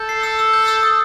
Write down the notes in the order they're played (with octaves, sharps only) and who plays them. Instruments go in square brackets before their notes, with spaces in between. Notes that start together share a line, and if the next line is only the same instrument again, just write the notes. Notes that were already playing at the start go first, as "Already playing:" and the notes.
Already playing: [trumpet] A4 [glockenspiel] G6
[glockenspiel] C7
E6
E6
G6
E6
D#6